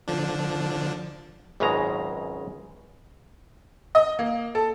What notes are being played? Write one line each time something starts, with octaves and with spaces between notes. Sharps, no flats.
D3 F3 D4
G#1 C#2 F#2 C#3 G#3 A#5
D#5
A#3
A4